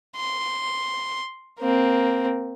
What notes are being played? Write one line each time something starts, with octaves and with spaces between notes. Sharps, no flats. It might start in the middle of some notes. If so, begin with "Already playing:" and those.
C6
A#3 C4